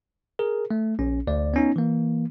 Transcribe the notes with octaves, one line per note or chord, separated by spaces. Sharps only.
G#4 A#4
A3
A#1 C#4
D2 D5
B3 C#4 D#4
E3 A#3